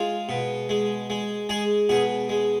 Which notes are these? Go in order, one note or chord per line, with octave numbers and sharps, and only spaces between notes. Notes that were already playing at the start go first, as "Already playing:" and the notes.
Already playing: G#3 F4
B2
G#3
G#3
G#3 G#4
B2 G#4
G#3